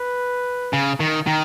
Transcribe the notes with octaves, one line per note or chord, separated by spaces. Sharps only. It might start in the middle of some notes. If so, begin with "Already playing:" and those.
Already playing: B4
C#3
D#3
D#3